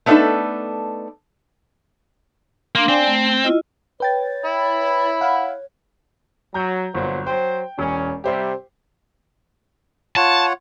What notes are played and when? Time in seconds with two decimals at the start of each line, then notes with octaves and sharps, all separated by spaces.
0.06 A3 B3 D4 D#4 A4 B4
2.75 A#3 D4 F5 C6
2.88 C4 D5 G#5
3.07 A3
3.44 E4 F4 D#5
4.00 B4 C#5 G5 A6
4.45 E4 B5
5.21 F5 F#5
6.54 F#3 A#5 G6
6.94 G1 A#2 F#3 C5
7.27 F#3 C5 G5
7.79 E1 C#4
8.24 C3 G3 G4 C5 E5
10.17 F4 C#5 F#5 A5